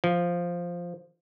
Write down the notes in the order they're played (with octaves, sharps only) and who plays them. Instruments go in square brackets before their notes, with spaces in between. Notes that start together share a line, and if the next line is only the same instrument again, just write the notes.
[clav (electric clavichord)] F3